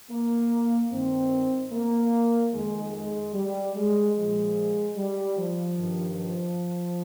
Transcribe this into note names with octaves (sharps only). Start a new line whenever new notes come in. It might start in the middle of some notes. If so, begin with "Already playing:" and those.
A#3
G2 D#3 C4
A#3
F2 D#3 G#3
G#3
G3
G#3
A#2 F3 G#3
G3
F3
G2 D#3
F3